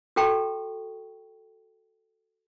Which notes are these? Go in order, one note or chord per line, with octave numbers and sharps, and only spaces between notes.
F#4 A4 G5 A#5 C#6